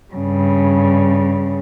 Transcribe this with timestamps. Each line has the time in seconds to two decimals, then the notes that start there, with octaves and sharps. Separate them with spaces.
0.14 G2 C#3